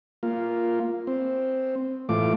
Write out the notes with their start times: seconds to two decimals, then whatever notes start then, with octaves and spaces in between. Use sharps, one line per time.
0.23 A#3 F4
1.07 C4
2.09 A2 E3 A3 F4 D6